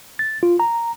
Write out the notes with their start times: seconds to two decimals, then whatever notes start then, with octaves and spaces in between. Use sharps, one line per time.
0.19 A6
0.43 F4
0.60 A#5